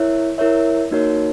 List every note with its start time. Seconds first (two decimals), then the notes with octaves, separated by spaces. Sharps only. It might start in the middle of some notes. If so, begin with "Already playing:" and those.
Already playing: E4 A#4 C#5 E5
0.38 E4 A#4 C#5 E5
0.91 A#3 D#4 F#4 A#4 C#5